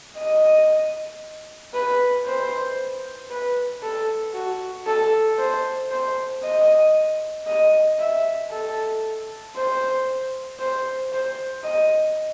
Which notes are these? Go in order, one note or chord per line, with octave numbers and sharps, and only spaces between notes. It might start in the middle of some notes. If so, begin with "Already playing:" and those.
D#5
B4
C5
B4
A4
F#4
A4
C5
C5
D#5
D#5
E5
A4
C5
C5
C5
D#5